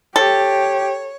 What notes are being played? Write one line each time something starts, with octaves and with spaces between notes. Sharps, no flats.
G4 A4 C#5